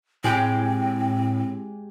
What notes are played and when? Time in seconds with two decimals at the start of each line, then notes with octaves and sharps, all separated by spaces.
0.24 A2 G#3 C4 G4 G5